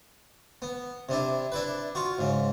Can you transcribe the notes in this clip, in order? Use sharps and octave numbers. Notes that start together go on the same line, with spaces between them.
B3
C3 D4 E4
D4 E4 B4
F4 F#4
G#2 C#3